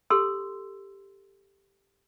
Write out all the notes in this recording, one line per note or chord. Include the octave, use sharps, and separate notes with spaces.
G4 A4 C6 E6